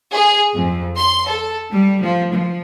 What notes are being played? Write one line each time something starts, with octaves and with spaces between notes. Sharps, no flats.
G#4
F2
C6
A4
G3
F3
F3